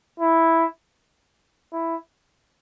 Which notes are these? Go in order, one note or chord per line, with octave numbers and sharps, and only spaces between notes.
E4
E4